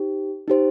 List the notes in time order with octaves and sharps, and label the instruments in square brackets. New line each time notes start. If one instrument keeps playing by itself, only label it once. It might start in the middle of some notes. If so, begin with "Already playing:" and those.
Already playing: [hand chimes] D#4 G4 C5
D#4 G4 C5